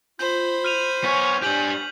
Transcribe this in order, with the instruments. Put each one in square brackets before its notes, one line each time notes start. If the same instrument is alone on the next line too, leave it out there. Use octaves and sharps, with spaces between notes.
[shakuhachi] F4 [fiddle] C5 B5 [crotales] G6
[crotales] F6 D#7 F7
[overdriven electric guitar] B3 C#5 [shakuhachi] G#5 [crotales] B6
[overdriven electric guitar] D4 G4 [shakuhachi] G#5 [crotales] G6 B6 F#7